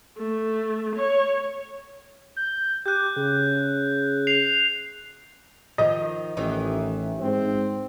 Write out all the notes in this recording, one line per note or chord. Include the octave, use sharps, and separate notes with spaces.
A3
C#5
G6
G4 F#6 G6
C#3
C7 F7
D#3 F3 D#5
A1 D#3 E3 D#4
G#2 C4